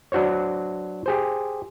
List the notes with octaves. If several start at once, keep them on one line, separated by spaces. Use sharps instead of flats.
F#3 D4 F#4 C5 C#5
G4 G#4 C5